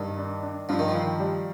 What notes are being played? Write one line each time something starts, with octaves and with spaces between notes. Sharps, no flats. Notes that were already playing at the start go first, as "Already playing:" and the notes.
Already playing: G2 D#3
D4
D4
G2 F3
D#3
F3
D#3
G3